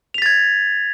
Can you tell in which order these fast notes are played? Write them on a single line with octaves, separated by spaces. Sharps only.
F7 B6 A6 G#6